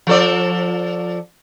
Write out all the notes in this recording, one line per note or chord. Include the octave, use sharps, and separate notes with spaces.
F3 A4 D5